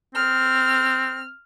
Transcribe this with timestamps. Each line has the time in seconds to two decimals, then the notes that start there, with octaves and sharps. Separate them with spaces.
0.15 C4 F6